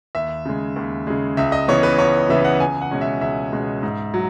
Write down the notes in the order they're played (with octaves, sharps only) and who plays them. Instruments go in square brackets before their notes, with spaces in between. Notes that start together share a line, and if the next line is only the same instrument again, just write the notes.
[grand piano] D#2 E5
C#3 G#3
D#2
C#3 G#3
C#2 E5
D#5
C#3 E3 B3 C#5
B4
C#2 C#5
C#3 E3 B3 E5
F#5
C#2 G#5
F#5
B2 G#3 C#4
E5
C#2 E5
B2 G#3 C#4
G#2
F#3